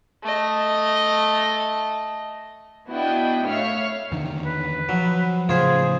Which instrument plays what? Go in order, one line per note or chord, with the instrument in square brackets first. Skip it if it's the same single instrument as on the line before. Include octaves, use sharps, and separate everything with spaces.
[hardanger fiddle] A3 D#5
[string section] B3 D4 E4 F#4 D#5 G5
A2 C#5 E5 F5 F6 C#7
[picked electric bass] E2 D3 D#3
[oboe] B4
[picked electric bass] F3 [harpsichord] F#3
[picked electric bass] A2 C#3 F3 [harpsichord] F4 C5 [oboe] G#4